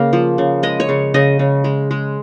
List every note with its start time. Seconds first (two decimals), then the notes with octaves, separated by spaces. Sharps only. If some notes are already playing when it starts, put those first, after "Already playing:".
Already playing: C#3 A#3 F5
0.13 F3
0.38 C#3
0.63 G#3 D#5
0.80 C#5
0.89 C#3
1.14 C#3 D#5
1.39 C#3
1.64 G#3
1.91 G#3